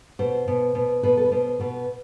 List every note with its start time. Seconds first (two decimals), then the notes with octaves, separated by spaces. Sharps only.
0.19 B2 C5
0.48 B2
0.75 B2
1.03 B2 B4
1.17 A4
1.24 B4
1.31 B2 C5
1.60 B2 B4